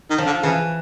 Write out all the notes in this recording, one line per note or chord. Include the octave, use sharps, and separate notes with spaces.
D#3
F3
D3
C#3 E3